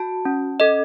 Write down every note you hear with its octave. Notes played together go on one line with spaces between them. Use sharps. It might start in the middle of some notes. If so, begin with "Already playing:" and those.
Already playing: F#4 A5
C#4
A4 D#5